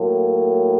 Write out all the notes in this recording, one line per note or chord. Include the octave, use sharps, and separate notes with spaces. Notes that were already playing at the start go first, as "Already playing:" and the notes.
Already playing: A2 F#3 A#3